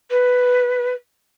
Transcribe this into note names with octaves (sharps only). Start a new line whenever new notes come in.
B4